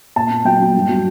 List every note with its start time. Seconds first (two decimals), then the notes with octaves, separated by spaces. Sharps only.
0.16 A#2 A5
0.31 A#2
0.45 F#3 G5
0.60 F#3
0.74 G2
0.89 F#3